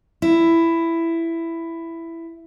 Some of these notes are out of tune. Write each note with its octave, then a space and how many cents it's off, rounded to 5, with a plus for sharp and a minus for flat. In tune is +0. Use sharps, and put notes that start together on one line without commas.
E4 +10